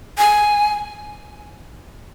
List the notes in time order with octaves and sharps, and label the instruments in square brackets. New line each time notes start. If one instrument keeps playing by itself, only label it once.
[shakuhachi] G#5